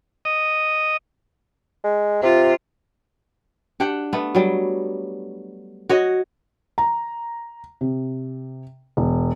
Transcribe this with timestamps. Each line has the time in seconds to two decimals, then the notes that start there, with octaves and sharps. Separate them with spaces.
0.25 D#5
1.84 G#3
2.23 C3 F4
3.80 D4 G4 F#5 G5
4.13 A3 B3
4.35 F#3 G3
5.89 F#4 C#5 D#5
6.78 A#5
7.81 C3
8.97 E1